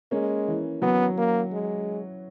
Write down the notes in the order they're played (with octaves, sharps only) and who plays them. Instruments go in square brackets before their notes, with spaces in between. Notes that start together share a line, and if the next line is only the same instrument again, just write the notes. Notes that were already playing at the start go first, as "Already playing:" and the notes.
[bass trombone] G#3 [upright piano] A#3 C#4
[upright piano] E3
[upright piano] F#3 [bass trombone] B3
[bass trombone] A#3
G#3